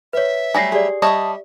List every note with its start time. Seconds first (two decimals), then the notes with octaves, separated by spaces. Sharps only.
0.13 B4 C#5 E5
0.54 F#3 G3 A3 G#5 A#6 C7
0.72 G4 G#4 D5
1.02 G3 C#5 D#5 E5 A5 C#6 D#6